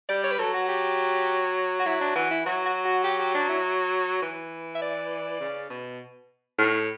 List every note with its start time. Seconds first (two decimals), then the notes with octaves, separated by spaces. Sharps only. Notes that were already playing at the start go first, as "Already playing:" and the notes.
0.09 G3 D5
0.24 C#5
0.31 B4
0.39 F#3 A4
0.54 F#4
0.68 G4
1.79 F#4
1.86 F#3 E4
2.01 D4
2.16 E3 F#4
2.31 E4
2.46 F#3 F#4
2.65 F#4
2.85 F#4
3.04 G4
3.19 G4
3.34 D4
3.49 E4
4.22 E3
4.75 E5
4.82 D5
5.41 C#3
5.70 B2
6.58 A2